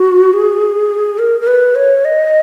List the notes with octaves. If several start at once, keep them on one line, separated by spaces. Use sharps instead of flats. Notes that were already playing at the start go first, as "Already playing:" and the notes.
Already playing: F#4
G#4
A#4
A#4
B4
C#5
D#5